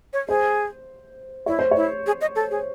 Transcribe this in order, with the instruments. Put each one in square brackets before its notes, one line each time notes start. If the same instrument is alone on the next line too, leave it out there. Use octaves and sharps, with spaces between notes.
[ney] C#5
[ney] G#4 [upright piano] C5
[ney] E4 [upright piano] C#5
[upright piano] C5
[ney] E4 [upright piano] C#5
[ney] G#4
D#5
A4
G#4